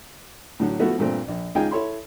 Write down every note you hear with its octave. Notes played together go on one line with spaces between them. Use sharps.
A2 D3 F#3
F3 A3 B3 E4 F#4
G2 A#2 A3 C4
A#1
C#2 D#4 F4 G#4 G5 G#5
E4 A4 C#5 B5 C6